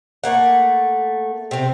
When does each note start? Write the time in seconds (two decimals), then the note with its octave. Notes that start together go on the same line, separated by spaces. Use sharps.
0.24 A3 A#3 F#5
1.51 C3 C4